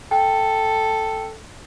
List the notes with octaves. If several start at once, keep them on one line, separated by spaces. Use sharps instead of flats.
A4 G5